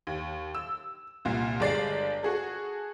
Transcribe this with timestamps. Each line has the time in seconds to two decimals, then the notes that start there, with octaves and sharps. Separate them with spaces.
0.07 D#2
0.55 E6
1.25 C2 A#2
1.60 G1 G#3 D5 A6 C7
2.23 F#4 G#4 A4